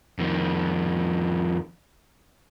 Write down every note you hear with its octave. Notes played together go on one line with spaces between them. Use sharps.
F2 D#3